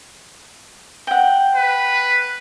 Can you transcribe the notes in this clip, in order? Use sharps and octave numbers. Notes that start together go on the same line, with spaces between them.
F#5 G5
B4